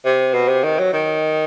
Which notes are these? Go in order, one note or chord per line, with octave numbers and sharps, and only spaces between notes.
C3
B2
C3
D#3
F#3
D#3